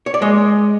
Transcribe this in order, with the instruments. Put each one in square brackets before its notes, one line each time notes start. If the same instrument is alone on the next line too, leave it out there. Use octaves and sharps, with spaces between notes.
[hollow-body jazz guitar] C#5
D5
G#3 D#5